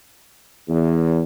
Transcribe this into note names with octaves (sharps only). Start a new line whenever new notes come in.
E2